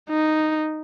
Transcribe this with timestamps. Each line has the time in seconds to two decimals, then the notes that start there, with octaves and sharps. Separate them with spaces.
0.10 D#4